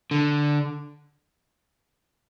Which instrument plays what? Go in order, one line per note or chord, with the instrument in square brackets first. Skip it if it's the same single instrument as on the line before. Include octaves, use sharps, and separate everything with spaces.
[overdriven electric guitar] D3